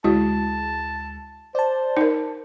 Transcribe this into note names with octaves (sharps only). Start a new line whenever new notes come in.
D2 G#3 E4 F#4 A5
C5 D5 A5
D#4 A#4